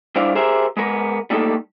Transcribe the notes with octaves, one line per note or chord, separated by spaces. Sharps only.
G3 D4 E4 C5 D5 F5
G4 G#4 A#4 C5 E5
G#3 B3 A#4
G3 A3 A#3 D#4 A4